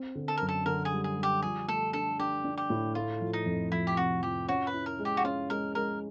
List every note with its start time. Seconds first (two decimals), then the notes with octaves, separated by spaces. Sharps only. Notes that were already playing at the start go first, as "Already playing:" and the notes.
Already playing: C4
0.15 D3
0.28 A4
0.37 F#2 A#4
0.49 A4
0.66 D3 A#4
0.85 G#4
0.92 G3
1.04 G#4
1.17 G3
1.23 G4
1.42 F3 G#4
1.68 A3 A4
1.93 D4 A4
2.19 D4 G4
2.45 D4
2.58 G4
2.70 A2
2.95 A3 F4
3.21 F3
3.33 D#4
3.46 F2
3.72 F3 E4
3.87 G4
3.97 C3 F#4
4.22 F3 G4
4.48 C#4 F#4
4.67 B4
4.73 E4
4.86 A#4
4.99 G#3
5.05 G4
5.17 F#4
5.24 C#4 F4
5.50 G#3 A#4
5.75 G#3 A#4